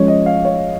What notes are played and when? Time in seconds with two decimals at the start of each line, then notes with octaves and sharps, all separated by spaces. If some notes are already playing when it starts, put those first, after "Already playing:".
Already playing: F3 G#3 C#4 C#5
0.08 D#5
0.26 F5
0.45 C#5